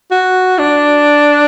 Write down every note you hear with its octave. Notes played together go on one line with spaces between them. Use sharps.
F#4
D4